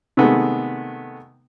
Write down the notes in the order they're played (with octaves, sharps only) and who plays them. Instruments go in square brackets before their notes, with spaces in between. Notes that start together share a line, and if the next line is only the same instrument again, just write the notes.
[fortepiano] C3 D#3 G#3 A3 B3